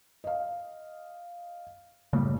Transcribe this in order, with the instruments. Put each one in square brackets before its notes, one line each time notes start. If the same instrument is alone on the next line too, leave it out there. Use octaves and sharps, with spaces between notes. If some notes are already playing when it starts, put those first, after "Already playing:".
[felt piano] D#5 F5
[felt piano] F#1 A2 [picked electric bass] C#3 G3